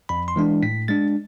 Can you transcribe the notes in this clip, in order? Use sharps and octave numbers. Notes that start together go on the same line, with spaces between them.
F2 B5
C6
E3 G#3 D4
A2 B6
G#3 D4 A6